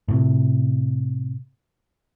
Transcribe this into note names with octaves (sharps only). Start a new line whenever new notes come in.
A2 C3